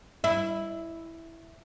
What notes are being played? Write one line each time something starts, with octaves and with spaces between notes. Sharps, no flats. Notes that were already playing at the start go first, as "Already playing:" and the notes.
E4